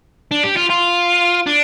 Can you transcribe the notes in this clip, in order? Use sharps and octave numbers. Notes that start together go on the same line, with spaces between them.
D4
G4
F4
F4
D4